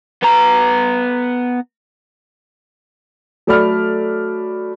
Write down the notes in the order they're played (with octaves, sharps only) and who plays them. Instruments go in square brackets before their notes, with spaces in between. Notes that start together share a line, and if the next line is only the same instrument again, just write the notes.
[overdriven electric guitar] B3 A#5
[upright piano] F#3 A3 A4 D5 B5 F6